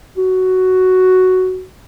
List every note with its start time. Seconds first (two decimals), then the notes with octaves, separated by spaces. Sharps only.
0.17 F#4